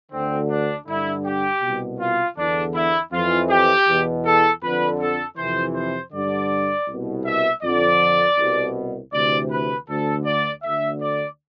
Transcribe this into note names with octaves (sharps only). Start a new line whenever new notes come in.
D2 D3 C4
D4
G2 D3 E4
G4
C2 B2
F4
E2 D3 D4
E4
F2 E3 F4
G4
E2 B2
A4
F2 D3 B4
A4
F2 C3 E3 C5
C5
G2 D3 D5
C2 B2
E5
F2 D3 D5
C2 B2
D2 C3 E3 D5
B4
D2 D3 A4
D5
D2 D3 E5
D5